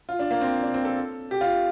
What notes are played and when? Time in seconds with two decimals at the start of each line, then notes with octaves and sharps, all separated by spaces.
0.09 F4
0.19 D4
0.31 A#3
0.41 C4
0.63 D4
0.74 C4
0.85 A4
1.31 G4
1.41 F4